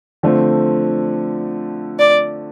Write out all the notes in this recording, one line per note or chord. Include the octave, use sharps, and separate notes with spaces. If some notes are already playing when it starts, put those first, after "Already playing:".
D3 F3 A3 C4
D5